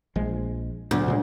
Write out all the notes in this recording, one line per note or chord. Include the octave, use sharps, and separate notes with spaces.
A#1 F3 G#3
D2 A#2 F#3 B3
A#2 C#3 G#3